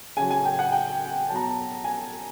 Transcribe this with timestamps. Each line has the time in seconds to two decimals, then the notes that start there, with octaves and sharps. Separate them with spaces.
0.17 C#3 F#3 G#5
0.31 G#5
0.45 G5
0.59 F#5
0.72 G5
1.29 F#3 A5
1.33 B2 A#5
1.43 A5
1.84 G#5